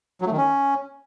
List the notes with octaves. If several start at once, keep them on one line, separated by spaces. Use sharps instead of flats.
F#3
A3
D#3
C#4